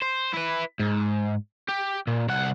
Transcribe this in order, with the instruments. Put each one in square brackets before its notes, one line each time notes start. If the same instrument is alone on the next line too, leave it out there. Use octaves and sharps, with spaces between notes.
[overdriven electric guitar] C5
E4 B4
G#2
G4
A#2
C2 F#5